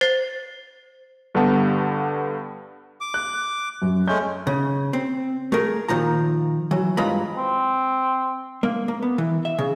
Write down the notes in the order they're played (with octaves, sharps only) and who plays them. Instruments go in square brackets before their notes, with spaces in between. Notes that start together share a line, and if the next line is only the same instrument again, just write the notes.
[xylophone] C5 A6 C7
[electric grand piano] G2 D3 G3 B3 A5
[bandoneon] D6
[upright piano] F#6
F#2
[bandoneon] G#3 A3 C#4 [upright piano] G6
[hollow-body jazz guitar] C#3
C4
A3 G#4 A#4
A#2 D#3 F3 A#5
E3 F#3
G2 E3 G#3 F4 A#5 B5
[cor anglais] C4
[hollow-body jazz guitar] A#3
A#3
B3
E3
E5
C#3